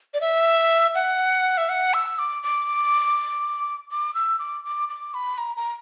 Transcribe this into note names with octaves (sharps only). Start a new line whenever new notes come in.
D5
E5
F#5
E5
F#5
E6
D6
D6
D6
E6
D6
D6
D6
B5
A#5
A#5